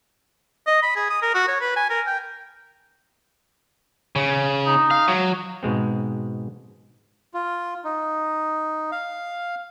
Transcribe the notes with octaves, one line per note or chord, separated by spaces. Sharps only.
D#5
B5
G#4
D#6
A#4
F#4
C#5
B4
G#5
A#4
G5
C#3
D#4
F5
F#3
G#2 B2 G#3 C4
F4
D#4
F5